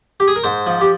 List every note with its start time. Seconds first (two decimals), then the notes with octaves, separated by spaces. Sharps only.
0.20 G4
0.28 G#4
0.36 A#4
0.44 G#2 C5
0.67 F3
0.81 G4